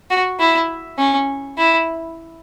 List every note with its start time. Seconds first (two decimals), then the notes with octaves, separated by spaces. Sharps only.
0.10 F#4
0.40 E4
0.98 C#4
1.58 E4